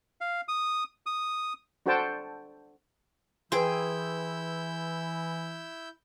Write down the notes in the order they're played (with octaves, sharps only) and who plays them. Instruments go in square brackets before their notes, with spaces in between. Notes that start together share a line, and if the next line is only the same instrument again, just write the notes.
[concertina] F5
D#6
D#6
[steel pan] D4 F#4 A4 C5 G5 A5
[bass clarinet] E3 [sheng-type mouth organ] E4 E6 G6 [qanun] G#4 G5 [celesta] B4 C6